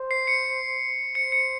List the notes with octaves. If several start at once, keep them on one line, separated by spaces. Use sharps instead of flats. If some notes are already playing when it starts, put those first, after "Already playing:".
Already playing: C5
C7
C#7
C5 C#7
C#7